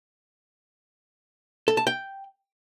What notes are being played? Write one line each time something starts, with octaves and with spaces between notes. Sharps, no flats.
A4
A5
G5